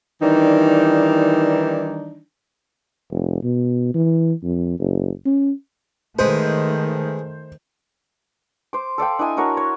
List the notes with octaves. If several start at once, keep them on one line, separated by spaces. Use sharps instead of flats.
D#3 E3 G3 D4 D#4
F1
B2
E3
F2
F#1
C#4
D#3 G#3 A3 G#4 B4 C5
C5 D6
A4 D5 F5 G5
D4 E4 D#5 G#5
D4 F#4 A#4 C#5
C#5